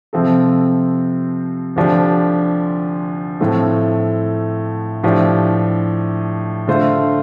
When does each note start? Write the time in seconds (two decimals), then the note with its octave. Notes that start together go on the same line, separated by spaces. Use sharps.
0.13 C3 F3 C4 A4
1.76 D2 D3 F3 D4 G4
3.40 A2 F3 A3 C4
5.03 A2 F3 D4 G4
6.68 D3 A3 F4 C5